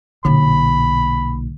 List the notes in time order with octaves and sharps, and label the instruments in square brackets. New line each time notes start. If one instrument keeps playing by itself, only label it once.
[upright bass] B1 A#2 [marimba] D3 [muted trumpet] B5